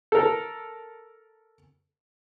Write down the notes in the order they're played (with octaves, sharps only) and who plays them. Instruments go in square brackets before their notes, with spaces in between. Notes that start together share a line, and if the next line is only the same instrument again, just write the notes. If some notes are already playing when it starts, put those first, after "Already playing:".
[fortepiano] A4 A#4